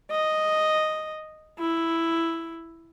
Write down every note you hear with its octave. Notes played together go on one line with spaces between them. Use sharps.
D#5
E4